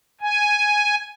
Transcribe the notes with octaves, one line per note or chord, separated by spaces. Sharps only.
G#5